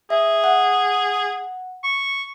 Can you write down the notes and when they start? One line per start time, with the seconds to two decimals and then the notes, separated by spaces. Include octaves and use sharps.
0.10 G#4 E5
0.44 F#5
1.84 C#6